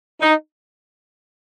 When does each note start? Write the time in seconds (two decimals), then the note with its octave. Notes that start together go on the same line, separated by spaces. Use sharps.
0.21 D#4